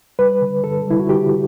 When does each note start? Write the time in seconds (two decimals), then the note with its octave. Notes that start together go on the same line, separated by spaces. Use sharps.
0.19 G3 B4
0.41 D3
0.64 D3 A4
0.87 G3 E4
0.99 F#4
1.09 D3 G4